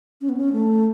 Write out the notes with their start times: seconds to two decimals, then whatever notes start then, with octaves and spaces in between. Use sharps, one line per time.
0.21 C#4
0.29 B3
0.37 C#4
0.53 A3